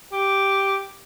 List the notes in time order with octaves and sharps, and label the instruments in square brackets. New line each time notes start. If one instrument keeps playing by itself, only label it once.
[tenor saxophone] G4